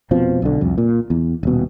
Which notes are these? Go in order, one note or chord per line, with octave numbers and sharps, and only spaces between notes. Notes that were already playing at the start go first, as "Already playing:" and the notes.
F1 B2 F3 C4
B1 D3
C2 F2
A#2
E2
D#1 B2